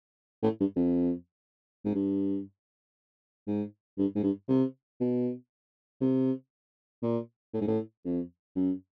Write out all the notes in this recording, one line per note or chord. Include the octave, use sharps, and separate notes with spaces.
A2
G2
F2
G#2
G2
G#2
G2
G#2
G2
C3
B2
C3
A#2
A2
G#2
A2
F2
F#2